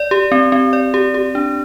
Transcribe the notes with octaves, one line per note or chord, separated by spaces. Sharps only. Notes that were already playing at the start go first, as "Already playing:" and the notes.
Already playing: D5
G4
C4
C4
D5
G4
G4
D4